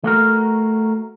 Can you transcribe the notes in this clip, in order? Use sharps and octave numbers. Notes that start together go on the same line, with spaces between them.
A3 F#4 A#4